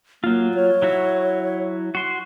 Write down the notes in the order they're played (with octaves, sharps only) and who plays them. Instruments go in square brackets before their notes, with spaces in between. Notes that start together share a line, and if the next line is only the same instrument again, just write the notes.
[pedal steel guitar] F#3 F4 [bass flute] A#3
[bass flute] C#5
[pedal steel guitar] F#3 E4 F#4
F#4 C6